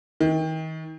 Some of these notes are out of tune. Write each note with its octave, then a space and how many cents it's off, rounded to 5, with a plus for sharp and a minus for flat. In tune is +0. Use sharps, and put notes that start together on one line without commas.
D#3 +40